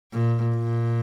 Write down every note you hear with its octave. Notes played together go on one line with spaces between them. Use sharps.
A#2
A#2